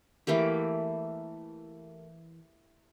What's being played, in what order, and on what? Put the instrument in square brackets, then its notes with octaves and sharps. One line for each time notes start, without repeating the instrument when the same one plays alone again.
[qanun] E3 A3 A#3 G4